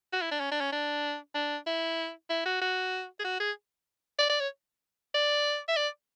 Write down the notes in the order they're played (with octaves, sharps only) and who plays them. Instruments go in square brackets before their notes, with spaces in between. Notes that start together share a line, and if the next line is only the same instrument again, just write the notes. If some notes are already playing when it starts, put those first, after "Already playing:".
[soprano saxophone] F#4
E4
D4
C#4
D4
C#4
D4
D4
E4
E4
F#4
F#4
G#4
F#4
G#4
D5
D5
C#5
D5
E5
D5